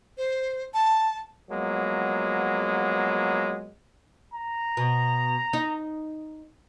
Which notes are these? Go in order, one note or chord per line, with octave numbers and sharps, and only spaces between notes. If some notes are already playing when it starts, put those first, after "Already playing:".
C5
A5
F3 F#3 G#3 A#3 B3
A#5
B2
D#4